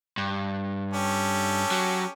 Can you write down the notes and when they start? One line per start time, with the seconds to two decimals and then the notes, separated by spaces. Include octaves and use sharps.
0.18 G2
0.94 C#4 G4 A4
1.71 F#3